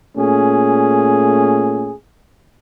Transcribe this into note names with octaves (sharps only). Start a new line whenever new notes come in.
A#2 A3 C#4 G#4